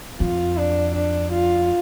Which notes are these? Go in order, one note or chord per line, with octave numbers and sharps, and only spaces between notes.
F2 F4
D4
D4
F4